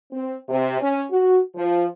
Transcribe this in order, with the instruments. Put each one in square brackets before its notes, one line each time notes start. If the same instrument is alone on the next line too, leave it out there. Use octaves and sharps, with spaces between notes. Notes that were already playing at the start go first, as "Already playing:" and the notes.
[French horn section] C4
C3
C#4
F#4
F3